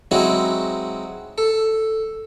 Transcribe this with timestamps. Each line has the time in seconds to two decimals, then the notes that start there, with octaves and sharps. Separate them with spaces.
0.11 F#3 G#3 C4 D#4 E4 F#4
1.38 A4